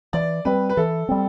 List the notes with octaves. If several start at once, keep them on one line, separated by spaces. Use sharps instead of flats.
E3 D5
G3 C4 B4
B4
E3 A4
G3 C4